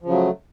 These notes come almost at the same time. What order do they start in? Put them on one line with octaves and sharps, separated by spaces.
F3 C#3 F#3 A3